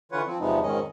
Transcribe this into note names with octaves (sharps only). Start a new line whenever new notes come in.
D3 E3 F4 B4 C#5 F#5
F3 C4
E2 C3 F3 G#3 B3 D#4
F2 G#2 D#3 C#4 D#5